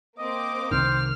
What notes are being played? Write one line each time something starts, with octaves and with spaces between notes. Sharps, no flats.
A#3 C4 D#5 D6
C2 C3 D#3 C5 F6